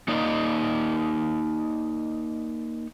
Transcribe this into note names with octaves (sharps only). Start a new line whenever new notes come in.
A#3 D#4 D5 D#5